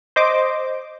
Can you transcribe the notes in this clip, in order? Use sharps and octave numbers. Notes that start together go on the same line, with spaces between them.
C5 D#5 D6